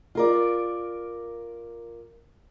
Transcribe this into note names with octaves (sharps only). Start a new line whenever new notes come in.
F4 A#4 D5